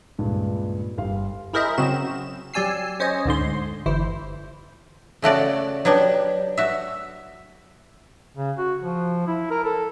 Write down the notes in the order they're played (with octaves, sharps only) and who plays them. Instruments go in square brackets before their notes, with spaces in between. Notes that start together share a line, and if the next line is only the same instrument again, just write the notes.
[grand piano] C#2 G2 A#2 G#3
G1 G3 F5 C6
[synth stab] E4 G#4 A#4 C5 D#5 E5
C#3 F#3 C4 F#4 E7
F#3 G4 D5 G#5 E6 C7
C#4 C5 C#5 D#5
D2 G#2 D3 C6
G1 E3 E4 C5
[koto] C#3 A3 F#4 D5
F#3 B3 D4 G4
F#4 E5
[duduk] C#3
F#4
F3
E4
A#4
A4